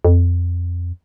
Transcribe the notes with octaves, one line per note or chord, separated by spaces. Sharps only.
F2